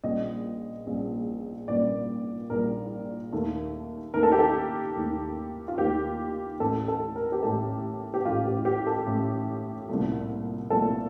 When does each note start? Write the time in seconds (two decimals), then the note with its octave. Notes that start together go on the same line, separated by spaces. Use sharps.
0.04 A#1 A#2 G3 D#5
0.87 A#1 A#2 G3
1.68 A#1 A#2 G3 D5
2.50 A#1 A#2 G3 A#4
3.32 D#2 D#3 A3
4.14 D#2 D#3 A3 A#4
4.23 A4
4.32 G4
4.39 A4
4.96 D#2 D#3 A3
5.68 F4
5.78 D#2 D#3 A3 G4
6.60 A1 A2 A3 A4
6.88 A4
7.16 A#4
7.32 G4
7.43 A1 A2 A3 A4
8.14 G4
8.25 A1 A2 A3 F4
8.46 G4
8.65 G4
8.87 A4
9.07 A1 A2 A3
9.89 C2 A#2 F3 A3
10.70 C2 A#2 F3 A3 A4